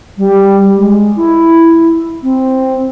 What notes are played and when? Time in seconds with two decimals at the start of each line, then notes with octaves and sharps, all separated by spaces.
0.18 G3
0.76 G#3
1.16 E4
2.23 C4